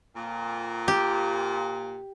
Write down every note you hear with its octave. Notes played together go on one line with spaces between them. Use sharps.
F2 A#2
G4